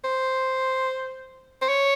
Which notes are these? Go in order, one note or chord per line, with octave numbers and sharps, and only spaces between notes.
C5
C5
C#5